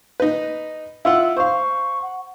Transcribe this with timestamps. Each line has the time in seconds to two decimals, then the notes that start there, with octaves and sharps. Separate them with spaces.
0.20 D#4 B4
1.05 E4 F4 F#5 E6
1.37 C5 F5 C#6
2.02 F#5